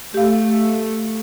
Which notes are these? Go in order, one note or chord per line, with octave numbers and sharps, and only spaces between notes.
A3 G4 F5